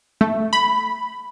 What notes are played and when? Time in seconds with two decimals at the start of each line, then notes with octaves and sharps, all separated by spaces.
0.21 A3
0.53 B5